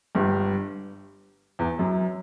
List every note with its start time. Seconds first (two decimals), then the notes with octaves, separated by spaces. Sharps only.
0.15 G1 G2
1.59 E2
1.79 F#2